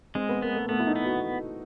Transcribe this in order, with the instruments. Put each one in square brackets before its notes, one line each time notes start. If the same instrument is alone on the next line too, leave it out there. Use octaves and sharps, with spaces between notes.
[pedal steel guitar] G#3 [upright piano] C4
[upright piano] B3
[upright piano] A#3 [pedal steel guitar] B3
[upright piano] A3
[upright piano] A3 [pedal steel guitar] B3
[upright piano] E4
D#4
[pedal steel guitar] B3
[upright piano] F#4